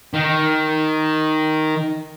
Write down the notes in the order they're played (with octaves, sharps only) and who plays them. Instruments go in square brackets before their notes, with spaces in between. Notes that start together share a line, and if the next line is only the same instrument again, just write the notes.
[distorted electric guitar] D#3